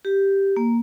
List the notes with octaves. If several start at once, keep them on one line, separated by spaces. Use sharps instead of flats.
G4
A#3